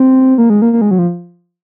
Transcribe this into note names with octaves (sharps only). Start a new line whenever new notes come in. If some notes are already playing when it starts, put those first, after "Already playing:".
Already playing: C4
A#3
G#3
A#3
A#3
G#3
F#3
F3